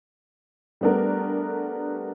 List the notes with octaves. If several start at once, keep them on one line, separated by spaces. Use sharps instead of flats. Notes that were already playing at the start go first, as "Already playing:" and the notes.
G3 A3 B3 D4 A#4